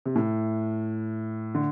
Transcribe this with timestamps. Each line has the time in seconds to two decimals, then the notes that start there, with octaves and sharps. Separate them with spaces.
0.06 C3
0.15 A2
1.55 D3